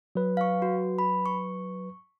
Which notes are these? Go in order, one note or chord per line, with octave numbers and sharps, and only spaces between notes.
F#3 B4
F5 C#6
F#4
B5
C#6